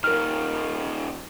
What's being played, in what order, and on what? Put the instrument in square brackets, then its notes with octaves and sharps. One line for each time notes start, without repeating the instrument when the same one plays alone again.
[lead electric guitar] D#3 G3 [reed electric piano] A#4 F6